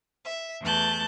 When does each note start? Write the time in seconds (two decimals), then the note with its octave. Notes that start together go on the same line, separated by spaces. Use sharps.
0.24 E5
0.61 E2 E3 A3 A5 F#6 G6